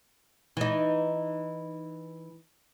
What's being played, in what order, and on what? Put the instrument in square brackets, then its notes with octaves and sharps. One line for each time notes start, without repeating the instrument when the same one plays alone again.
[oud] E3 D#4